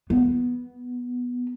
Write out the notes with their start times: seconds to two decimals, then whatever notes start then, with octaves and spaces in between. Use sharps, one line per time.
0.10 B3